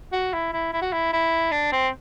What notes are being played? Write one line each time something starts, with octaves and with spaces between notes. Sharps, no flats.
F#4
E4
E4
E4
F#4
E4
E4
D4
C4